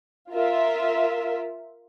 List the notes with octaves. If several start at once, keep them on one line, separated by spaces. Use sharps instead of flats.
F4 A#4 E5